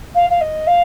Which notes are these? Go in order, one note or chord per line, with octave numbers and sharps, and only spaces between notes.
F5
F5
D#5
F5